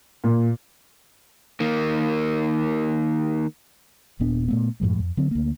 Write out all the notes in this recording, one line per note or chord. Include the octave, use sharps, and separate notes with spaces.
A#2
D#3 A#3
D#1 A#2 B3 D4
A#2 A3 B3
F#2 A2 F3 G#3
F2
D3 F#3 C4
D2 A#3